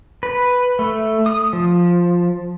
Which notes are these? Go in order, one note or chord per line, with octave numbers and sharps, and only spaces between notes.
B4
A3
D#6
F3